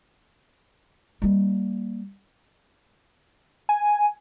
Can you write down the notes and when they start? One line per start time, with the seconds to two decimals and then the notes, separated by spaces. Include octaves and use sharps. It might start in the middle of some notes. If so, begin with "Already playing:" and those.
1.22 G3 A#3
3.69 G#5